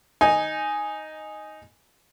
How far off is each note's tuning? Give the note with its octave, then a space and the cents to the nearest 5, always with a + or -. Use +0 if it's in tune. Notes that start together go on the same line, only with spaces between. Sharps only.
D#4 +0 G#5 +0